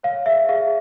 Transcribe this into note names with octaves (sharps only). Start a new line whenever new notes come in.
C#5 F5
G#4 E5
G#4 F5